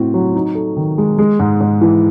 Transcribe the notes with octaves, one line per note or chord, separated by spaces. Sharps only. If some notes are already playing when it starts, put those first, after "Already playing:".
Already playing: A2 C4 F#4
F#3
D#4
A4
D#3
G#3
G#3
G#2
G#2
E3